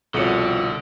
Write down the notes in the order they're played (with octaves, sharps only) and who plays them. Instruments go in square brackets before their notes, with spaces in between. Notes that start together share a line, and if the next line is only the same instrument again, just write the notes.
[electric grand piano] C2 B2 C#7 [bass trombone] F2 [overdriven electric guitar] D3 [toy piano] A4 C#5